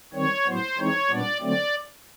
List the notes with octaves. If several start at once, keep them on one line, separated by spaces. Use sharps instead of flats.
D#3 G3 C4 C#5
A2 F#3 B3 C5
E3 G#3 C4 D#4 C#5
A#2 G3 B3 D4 D5
D3 F#3 A3 C4 D5